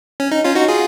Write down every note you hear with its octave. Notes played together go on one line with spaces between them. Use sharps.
C#4
D#4
C#4 F4
D#4 F#4
F4 G#4